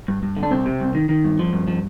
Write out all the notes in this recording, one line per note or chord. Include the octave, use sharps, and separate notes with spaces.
G2
G2
D3
D4
C2 C4
C3
C2
D#3
D#3
G2
F3
G2
F3